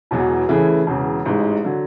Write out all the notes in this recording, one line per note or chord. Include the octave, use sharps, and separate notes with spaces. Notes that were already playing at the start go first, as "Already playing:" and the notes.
E1 E2 B2 F#3
C#3 E3 A3 C#4 G#4
E1 E2 C#3
A1 G#2 G#3
D3 F#3